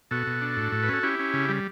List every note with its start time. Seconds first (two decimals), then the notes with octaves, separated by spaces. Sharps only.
0.11 B2 F#4 A4
0.27 B2
0.41 D4
0.57 A2
0.72 A2
0.83 B4
0.89 C#4 A4
1.03 C#4 E4 G4
1.19 C#4
1.34 C#3
1.49 G3